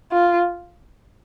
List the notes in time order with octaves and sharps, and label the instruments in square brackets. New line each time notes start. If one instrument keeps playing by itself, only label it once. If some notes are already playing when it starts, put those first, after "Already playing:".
[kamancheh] F4